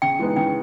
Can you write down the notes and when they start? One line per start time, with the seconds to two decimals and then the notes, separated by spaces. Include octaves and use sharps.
0.02 C#3 G5
0.19 E3 G#3 B3 D#4
0.36 C#3 G5